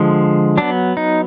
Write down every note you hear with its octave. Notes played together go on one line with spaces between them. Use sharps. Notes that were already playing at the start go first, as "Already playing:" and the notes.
Already playing: D3 F3 G#3
F#3 B3 D4
D#4